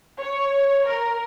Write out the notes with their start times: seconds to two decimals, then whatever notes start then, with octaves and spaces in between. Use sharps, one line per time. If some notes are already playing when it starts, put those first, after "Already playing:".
0.20 C#5
0.88 A#4